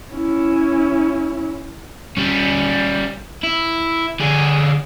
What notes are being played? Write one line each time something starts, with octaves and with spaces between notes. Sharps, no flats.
C#4 E4
G3 C#4
E4
D3 G#4